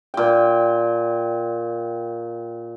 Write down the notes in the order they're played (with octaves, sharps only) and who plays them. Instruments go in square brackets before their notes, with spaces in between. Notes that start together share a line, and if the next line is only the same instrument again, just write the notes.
[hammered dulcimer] A#2 G5